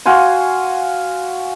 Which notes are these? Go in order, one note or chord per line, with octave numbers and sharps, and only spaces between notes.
F#4 F5 G#5 C6